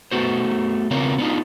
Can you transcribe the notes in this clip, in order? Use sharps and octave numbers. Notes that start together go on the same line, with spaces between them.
A3 B3 F#4 C5
C#3 B3 C4 F4 A#4 C#5
B3 D4 D#4 F4